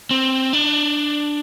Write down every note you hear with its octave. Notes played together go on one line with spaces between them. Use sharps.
C4
D4